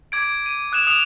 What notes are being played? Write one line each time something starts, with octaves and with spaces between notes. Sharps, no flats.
D6 G#6 D7
D#7
D#6 F#6 G#6 E7 F7
D#6 F7